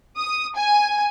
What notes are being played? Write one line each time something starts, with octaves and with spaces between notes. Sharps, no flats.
D#6
G#5